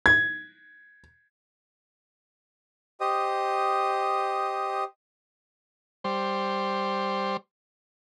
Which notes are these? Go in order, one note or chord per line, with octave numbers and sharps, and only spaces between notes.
G#6
G4 C5 D#5 D#6
G3 C5